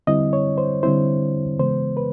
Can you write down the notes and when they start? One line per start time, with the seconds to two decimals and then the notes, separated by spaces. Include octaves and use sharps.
0.07 D3 G3 C4 E4 D#5
0.33 C#5
0.58 C5
0.83 D3 G3 C4 E4 C5
1.59 C#3 E3 G#3 B3 C5
1.97 B4